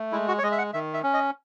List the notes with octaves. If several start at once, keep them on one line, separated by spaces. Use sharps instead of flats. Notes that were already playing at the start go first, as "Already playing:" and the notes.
Already playing: A3
G#3 E4
F#4
C#5
G#3 D#5
E5
F#5
D#3 E5
E5
C#4
D#5